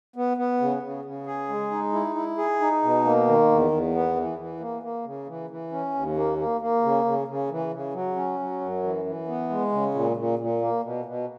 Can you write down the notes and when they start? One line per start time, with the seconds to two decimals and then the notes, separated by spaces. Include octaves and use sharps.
0.16 B3
0.37 B3
0.60 C#3
0.83 C#3
1.05 C#3
1.26 G#4
1.49 G#3
1.71 D#4
1.93 E4
2.16 E4
2.38 G#4
2.60 D#4
2.83 B2
3.05 A#3
3.26 D#3
3.50 E2
3.71 E2
3.94 B3
4.16 E3
4.38 E3
4.60 A#3
4.83 A#3
5.05 C#3
5.27 E3
5.50 E3
5.72 C#4
5.94 D#2
6.17 A#3
6.38 A#3
6.61 A#3
6.83 C#3
7.05 C#3
7.28 C#3
7.50 E3
7.72 C#3
7.93 F#3
8.16 C#4
8.39 F#3
8.61 F#2
8.83 E3
9.05 E3
9.28 B3
9.49 G#3
9.72 C#3
9.94 A#2
10.17 A#2
10.39 A#2
10.61 A#3
10.83 B2
11.05 B2